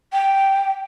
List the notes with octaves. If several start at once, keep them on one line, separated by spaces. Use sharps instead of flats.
G5